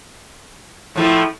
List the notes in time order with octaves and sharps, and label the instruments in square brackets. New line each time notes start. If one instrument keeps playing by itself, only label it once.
[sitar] A2 F3 A3 [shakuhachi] E4